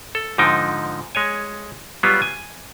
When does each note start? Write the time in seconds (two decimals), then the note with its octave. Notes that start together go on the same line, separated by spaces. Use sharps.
0.15 A4
0.38 G#2 D3 F3 D#4 G5
1.15 G#3 C#5 G#5
2.03 F#3 G3 B3 F4
2.22 G#5